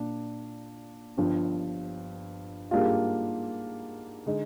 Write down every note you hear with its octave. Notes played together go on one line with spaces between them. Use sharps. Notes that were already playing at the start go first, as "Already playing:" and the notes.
Already playing: A#2 D4
G1 G2 F3
G#2 G3 A#3 D4 F4
D3 G#3 D#4